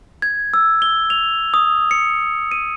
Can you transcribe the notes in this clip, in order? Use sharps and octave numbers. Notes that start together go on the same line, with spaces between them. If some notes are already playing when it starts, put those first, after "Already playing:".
G#6
E6
G7
F7
D#6
C#7
D#7